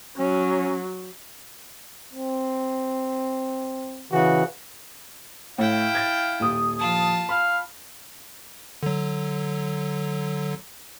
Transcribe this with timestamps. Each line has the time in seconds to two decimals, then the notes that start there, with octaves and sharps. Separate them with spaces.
0.18 F#3 C#4
2.13 C4
4.12 C#3 E3 F#4
5.58 A2 E4 F5 G5
5.95 G#6 A6
6.40 D#1 D#6
6.79 F3 F4 A5
7.29 F5 B5
8.83 D3 F#3